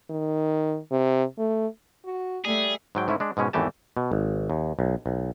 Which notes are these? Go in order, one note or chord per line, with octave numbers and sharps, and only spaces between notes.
D#3
C3
A3
F#4
G3 A3 G#4
G#2 F#3 G5
G#2 A3 C#4 E4
G#3 D4
G#2 B2 G#3 C#4
G#1 E2 E3 A3 G4 A5
B2
G#1
D#2
B1
B1